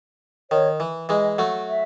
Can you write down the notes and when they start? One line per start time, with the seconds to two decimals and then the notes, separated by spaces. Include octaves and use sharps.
0.51 D#3 C#5
0.80 E3
1.09 E3 G#3 D#5
1.38 F#3 A3
1.68 E5